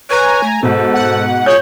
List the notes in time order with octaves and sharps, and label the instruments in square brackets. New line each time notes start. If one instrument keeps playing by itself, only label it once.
[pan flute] B4 [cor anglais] C#5 [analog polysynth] G#5 A#5
[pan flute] A3
[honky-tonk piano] G#2 B2 [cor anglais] A4 [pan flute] C5
[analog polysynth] F#5
[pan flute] F4 [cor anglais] G#4 [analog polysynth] C#5 [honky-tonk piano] G6 F#7